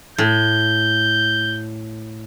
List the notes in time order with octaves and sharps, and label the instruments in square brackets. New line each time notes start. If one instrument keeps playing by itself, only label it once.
[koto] A2 [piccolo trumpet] G6